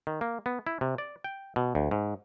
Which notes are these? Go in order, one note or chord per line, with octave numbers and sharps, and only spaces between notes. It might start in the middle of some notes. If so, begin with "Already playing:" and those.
D#3
A#3
B3
E4
C3
D5
G5
B2
D2
G#2